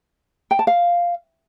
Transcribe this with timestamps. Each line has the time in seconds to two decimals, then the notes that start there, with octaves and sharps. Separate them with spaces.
0.51 G5
0.59 A5
0.67 F5